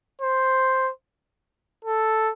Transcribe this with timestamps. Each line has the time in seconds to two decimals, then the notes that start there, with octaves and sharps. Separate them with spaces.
0.22 C5
1.85 A4